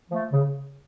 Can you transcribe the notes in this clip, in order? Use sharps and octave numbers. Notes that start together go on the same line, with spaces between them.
F3 A3
C#3